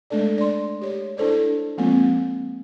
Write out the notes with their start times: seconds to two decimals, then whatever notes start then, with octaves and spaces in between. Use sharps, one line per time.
0.10 G#3 A3 D4 A4 D5
0.38 D5 C6
0.81 G4 C#5
1.17 D4 E4 A4 C5 D5
1.78 F3 G#3 A#3 C4 F4